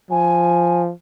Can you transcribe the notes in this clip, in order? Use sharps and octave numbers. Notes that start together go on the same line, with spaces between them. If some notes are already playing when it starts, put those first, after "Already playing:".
F3 G#5